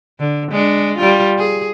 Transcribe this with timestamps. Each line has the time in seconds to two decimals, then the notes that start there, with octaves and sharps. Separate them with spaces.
0.19 D3
0.51 G#3 D4
0.97 G3 F4
1.39 G#4